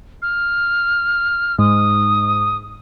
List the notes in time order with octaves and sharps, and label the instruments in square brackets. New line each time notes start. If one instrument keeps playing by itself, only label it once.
[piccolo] F6
[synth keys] G#2 [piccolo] D#6